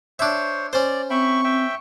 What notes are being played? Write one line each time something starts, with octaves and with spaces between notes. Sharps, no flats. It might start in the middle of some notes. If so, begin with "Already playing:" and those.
D4 C5 C#5 E5
C#4 C5 D5
C4 E5 G5 B5 C#6
E5 G5